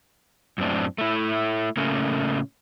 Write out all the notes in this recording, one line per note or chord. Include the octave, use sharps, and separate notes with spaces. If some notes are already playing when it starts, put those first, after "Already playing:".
F#2 A2 C4 D4
A3 E4
A2 C#3 A3 A#3 C#4